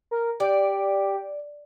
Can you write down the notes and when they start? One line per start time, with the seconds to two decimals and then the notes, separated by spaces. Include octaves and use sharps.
0.11 A#4
0.40 G4 D5